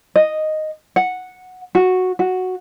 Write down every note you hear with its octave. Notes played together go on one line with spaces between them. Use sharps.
D#5
F#5
F#4
F#4